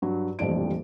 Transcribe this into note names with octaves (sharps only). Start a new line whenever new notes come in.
G2 F#3
D#1 A1 F2 D4 D7